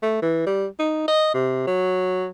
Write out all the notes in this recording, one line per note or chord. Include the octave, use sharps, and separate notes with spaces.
A3
E3
G3
D#4
D#5
C3
F#3